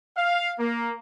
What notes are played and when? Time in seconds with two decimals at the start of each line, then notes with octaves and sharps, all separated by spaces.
0.17 F5
0.59 A#3